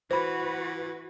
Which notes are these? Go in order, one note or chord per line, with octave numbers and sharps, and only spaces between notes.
E3 F#4 B4 C5 B5